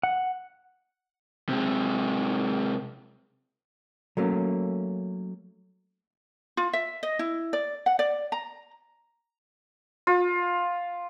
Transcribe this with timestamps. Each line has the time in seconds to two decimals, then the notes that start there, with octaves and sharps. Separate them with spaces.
0.03 F#5
1.49 C3 G#3
4.17 F#3 A3 A#3 C#4
6.57 F4
6.73 E5
7.03 D#5
7.19 E4
7.53 D5
7.86 F#5
7.99 D5
8.32 A#5
10.07 F4